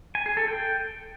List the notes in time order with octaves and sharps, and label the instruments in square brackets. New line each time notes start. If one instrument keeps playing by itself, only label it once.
[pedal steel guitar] G#5
G#4
A4
G5